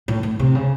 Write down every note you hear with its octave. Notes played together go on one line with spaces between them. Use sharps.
A2
A2
C3
C#3